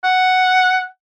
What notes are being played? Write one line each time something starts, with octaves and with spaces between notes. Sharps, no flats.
F#5